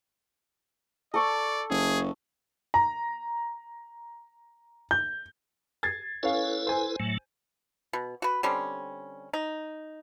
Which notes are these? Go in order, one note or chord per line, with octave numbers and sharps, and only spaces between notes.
A4 D5 C#6
F#1 G#4
A#5
G6
G#6 A6 C7
C#4 E4 A4 B4 F5
C5 G#5
A2 F#3 A3
B2
F#4 B4
D3 G3 C4 C#4
D#4